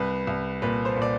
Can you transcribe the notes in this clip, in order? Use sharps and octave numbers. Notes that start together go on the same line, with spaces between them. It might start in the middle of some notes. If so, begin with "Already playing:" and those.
Already playing: C2 B4
C2
A#2 B4
C5
A#2
D5